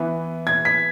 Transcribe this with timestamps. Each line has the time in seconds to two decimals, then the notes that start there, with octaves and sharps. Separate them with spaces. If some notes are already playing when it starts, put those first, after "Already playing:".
Already playing: E3 B3 E4
0.47 G#6
0.65 B6